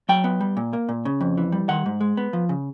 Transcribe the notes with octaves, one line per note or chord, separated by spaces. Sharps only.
F#3 G5
B3
G3
A#2
A#3
A#2
C#3
F2
E3
G3
D#3 F#5
G#2
G#3
B3
F3
C#3